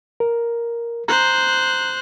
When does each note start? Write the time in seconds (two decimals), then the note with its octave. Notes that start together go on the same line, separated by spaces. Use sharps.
0.20 A#4
1.08 C5 A#5 F#6